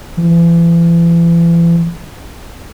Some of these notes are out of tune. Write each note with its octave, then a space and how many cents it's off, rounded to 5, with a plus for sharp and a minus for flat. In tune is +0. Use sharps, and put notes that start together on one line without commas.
E3 +40